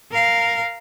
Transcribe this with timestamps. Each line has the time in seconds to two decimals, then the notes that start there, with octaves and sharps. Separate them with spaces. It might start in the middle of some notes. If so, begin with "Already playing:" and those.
0.11 A#4 F5